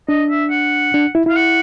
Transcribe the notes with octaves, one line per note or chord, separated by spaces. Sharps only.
D4 D#5
E5
F#5
D4
E4
E4 F5
F#5